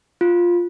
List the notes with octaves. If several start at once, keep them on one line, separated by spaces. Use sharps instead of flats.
F4